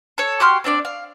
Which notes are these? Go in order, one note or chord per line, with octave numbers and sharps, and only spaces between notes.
A4 C#5
F#4 G4 C6 F6
C4 D4 C#5 D5
F5